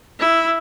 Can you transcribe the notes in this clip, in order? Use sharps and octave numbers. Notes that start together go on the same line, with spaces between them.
E4